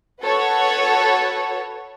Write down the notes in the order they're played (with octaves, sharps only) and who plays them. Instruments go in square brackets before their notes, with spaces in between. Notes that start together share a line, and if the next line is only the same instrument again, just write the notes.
[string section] F#4 A4 B4 C#5 F#5